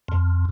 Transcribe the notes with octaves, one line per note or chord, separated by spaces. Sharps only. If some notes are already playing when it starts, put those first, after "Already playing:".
F2